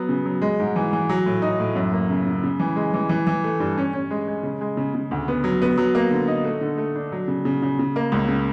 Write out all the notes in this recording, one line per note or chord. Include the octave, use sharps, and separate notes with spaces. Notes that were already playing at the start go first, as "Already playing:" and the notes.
Already playing: F#3 B3
C#3
F#3
G#3
G#2
E3
E3
F#3
A2
D#4
A2
F#2
A#3
C#3
C#3
C#3
E3
G#3
E3
E3
E3
A3
G2
C#4
C#4
G#3
G#3
C#3
G#3
C#3
C#3
D2
B3
F#3
B3
F#3
A#3
D3
D#4
A3
D3
A3
D4
F#3
C#3
C#3
C#3
C#3
A#3
C#2
C#3